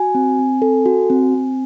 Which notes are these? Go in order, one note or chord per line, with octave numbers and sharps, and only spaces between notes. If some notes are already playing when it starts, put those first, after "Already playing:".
Already playing: F#4 G#5
C4
C4
A4
F#4
C4
C4